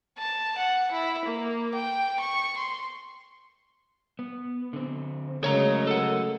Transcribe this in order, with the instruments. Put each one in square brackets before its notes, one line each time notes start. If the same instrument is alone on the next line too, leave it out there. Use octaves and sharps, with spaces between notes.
[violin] A5
F#5
E4
A#3
G5
C#6
C6
[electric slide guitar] B3
D3 C4
[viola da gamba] C#3 G#3 A3 [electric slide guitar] F#3 A#4 [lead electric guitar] C#5 A#5
[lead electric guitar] A4 F#5